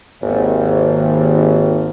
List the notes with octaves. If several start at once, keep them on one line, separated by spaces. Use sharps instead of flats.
G#1 D#2